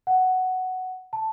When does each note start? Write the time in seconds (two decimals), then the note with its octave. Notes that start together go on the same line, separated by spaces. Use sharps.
0.07 F#5
1.13 A5